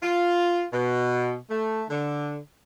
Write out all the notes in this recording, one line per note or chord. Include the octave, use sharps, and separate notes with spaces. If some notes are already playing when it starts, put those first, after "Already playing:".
F4
B2
A3
D3